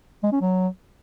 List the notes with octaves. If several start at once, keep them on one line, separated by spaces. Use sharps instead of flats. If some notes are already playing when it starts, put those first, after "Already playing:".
G#3
C#4
F#3